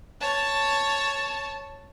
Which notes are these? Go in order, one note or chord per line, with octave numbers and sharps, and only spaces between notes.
C#5 A5